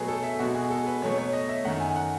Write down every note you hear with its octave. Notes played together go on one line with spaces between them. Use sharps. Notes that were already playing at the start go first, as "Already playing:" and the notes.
Already playing: B2 F#3 A3 G#4 B4
A4
E5
B2 G#3 F#4
G#4
A4
B4
B2 F#3 A3 C#5
C#5
D#5
E5
F#2 D#3 A3 F#5
G#5
F#5